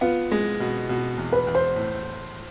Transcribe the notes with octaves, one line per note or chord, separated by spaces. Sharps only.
B3 F4
G#3
B2
B2
E2
B4
E2
C5
A2